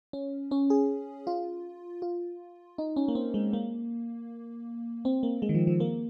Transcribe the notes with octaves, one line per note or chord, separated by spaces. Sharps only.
C#4
C#4
G#4
F4
F4
D#4
C#4
A#3
C4
G#3
A#3
C4
A#3
G#3
D#3
F3
F3
A#3